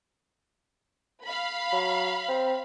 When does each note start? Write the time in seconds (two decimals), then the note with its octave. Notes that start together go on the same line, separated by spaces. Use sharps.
1.24 F5 B5
1.73 F#3
2.28 C4